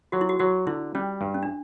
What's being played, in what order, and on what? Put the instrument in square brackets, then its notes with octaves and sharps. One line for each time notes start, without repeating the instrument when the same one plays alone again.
[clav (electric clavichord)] F#3 [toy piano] F#4
[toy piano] E4
F#4
[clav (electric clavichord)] F#3 [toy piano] F#4
[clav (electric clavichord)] D3 [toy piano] E4
[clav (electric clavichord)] G3 [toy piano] C#4
[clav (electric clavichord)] G2
[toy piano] C#4
D4